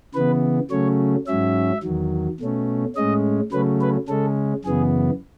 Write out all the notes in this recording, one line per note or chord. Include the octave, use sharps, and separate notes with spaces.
C#3 E3 B3 B4
C#3 F#3 A3 C#4 C#5
G#2 F#3 C#4 E5
E2 D#3 F#3
B2 A3 C#4
A2 G#3 C#4 D#5
C#3 F#3 A3 C#4 B4
B4
C#3 G#3 C#4 A4
F#2 C#3 E3 B3 G#4